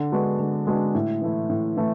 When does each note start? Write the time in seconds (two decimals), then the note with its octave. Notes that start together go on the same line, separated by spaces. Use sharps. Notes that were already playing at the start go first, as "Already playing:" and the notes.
Already playing: D3
0.12 G#3 B3 D4 F#4
0.39 D3
0.67 G#3 B3 D4 F#4
0.95 A2
1.22 E3 A3 E4
1.49 A2
1.77 E3 A3 E4